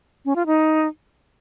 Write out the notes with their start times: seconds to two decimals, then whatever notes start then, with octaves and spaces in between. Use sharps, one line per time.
0.25 C#4
0.36 F4
0.46 D#4